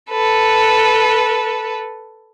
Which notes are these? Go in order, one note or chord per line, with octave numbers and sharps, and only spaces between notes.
A4 B4